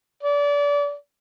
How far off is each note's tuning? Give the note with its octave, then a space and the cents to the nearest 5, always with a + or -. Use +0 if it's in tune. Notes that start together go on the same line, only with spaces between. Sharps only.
D5 -30